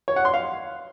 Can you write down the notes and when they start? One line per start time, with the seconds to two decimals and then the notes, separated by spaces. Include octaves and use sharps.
0.08 C#5
0.16 F#5
0.25 C6
0.34 F5